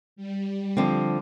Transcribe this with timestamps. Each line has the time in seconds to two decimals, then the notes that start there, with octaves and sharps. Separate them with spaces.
0.16 G3
0.77 D3 F3 C4